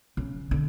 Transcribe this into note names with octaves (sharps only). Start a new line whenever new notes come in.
C#3
D3